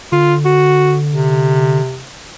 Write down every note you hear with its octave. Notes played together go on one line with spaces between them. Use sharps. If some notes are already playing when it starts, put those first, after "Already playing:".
D3 F4
F#4
C3